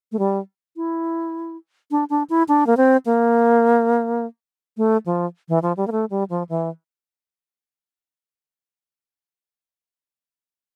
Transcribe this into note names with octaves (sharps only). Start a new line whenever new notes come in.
A3
G3
E4
D4
D4
E4
D4
A#3
C4
A#3
A3
F3
E3
F3
G3
A#3
A3
G3
F3
E3